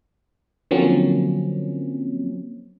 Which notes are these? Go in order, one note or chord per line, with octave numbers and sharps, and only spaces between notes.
D3 F3 F#3 A#3 C4 C#4